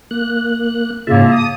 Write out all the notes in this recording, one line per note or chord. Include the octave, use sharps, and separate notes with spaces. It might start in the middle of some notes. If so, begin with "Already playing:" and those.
A#3 F#6
G#2 C#3 A#3 F4 E5 A5
A5 D#6